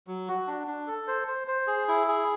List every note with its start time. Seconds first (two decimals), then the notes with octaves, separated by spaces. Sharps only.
0.07 F#3
0.28 F#4
0.47 D4
0.67 D4
0.87 A4
1.08 C5
1.28 C5
1.48 C5
1.67 G#4
1.88 E4
2.08 G#4